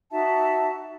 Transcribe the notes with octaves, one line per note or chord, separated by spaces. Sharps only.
D#4 F#4 E5 A5